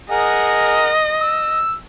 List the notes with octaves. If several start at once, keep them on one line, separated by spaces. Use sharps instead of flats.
G#4 A#4 D#5 F#5
E6